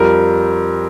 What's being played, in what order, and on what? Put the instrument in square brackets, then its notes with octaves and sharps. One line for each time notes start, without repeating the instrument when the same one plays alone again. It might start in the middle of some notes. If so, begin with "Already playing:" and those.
Already playing: [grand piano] F2 G3 A#4